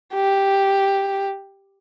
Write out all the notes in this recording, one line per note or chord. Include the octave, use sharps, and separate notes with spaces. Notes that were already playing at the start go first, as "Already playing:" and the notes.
G4